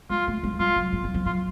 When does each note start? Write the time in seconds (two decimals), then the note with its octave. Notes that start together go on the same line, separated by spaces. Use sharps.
0.10 G#3 F4
0.28 A3
0.43 G#3
0.59 G3 F4
0.76 F#3
0.93 G#3
1.04 G3
1.14 F3
1.26 F#3 F4